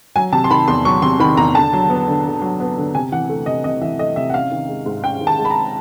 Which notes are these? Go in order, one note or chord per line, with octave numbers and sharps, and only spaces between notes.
F#3 G#5
C3 A5
C6
D#3 B5
E2 C6
F#3 C#6
C3 C6
D#3 B5
E2 A#5
D3 A5
F#3
B3
D3
D3
F#3
B3
D3
C3 G#5
E3 F#5
A3
C3 D#5
C3 D#5
E3 E5
A3 D#5
C3 E5
F#5
C#4 F5
D#3
G#3
G#2
C#4 G5
D#3
A5
G#3
B5
A#5